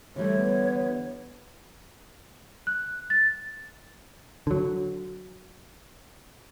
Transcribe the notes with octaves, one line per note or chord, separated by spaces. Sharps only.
D3 E3 G3 A3 C#5
B3
F#6
A6
D3 F#3